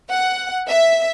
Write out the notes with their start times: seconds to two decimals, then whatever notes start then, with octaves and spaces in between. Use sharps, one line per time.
0.10 F#5
0.67 E5